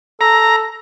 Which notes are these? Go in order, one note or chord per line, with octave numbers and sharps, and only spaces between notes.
A4 A#5